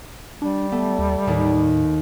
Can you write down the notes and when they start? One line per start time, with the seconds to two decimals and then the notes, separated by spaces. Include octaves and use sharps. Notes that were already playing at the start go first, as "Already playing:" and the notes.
0.42 G3 D4
0.72 A3 B3
0.99 D#2
1.27 D#2 A2